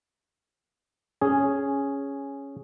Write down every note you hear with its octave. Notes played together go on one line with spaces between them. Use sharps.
C#4 G#4